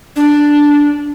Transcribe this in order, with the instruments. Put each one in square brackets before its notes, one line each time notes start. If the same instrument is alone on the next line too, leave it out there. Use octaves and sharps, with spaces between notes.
[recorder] D4